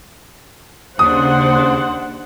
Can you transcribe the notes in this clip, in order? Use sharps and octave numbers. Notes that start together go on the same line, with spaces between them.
D#2 C#3 D4 C5 F#5 D#6